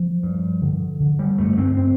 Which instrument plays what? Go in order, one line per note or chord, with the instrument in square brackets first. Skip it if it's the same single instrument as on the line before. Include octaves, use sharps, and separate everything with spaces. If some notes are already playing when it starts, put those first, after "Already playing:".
Already playing: [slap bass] F3
G2
D3
D3
G3
G2 A3
C4
C4